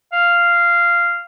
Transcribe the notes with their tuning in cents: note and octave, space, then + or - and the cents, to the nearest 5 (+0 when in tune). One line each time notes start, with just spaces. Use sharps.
F5 -10